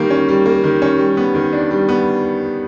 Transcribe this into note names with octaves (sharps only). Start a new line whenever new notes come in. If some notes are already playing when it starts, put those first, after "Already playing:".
Already playing: D#3 G3 A#3
C#4
G3
A#3
D#3
C#4
G3
B3
D#3
D4
G3
B3